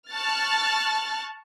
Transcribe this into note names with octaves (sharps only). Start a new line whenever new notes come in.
A5 C#6 F6 F#6 A6